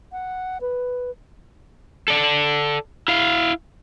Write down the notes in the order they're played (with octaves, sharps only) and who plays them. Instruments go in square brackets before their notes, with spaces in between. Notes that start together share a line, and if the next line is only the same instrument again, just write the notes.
[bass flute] F#5
B4
[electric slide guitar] A4 D5
E4 F5